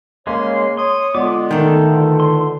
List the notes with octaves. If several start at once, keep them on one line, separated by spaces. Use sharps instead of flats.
C#3 G#3 A#3 C#4 C#5 C6
C#5 C6 D#6
D3 G#3 B3 F4 D5 D6
D#3 A3 A4 G5
E2 A#2 D3
C6